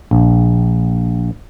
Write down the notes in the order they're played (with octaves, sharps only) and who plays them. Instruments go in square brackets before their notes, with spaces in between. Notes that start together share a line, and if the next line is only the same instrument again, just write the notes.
[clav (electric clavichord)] A#1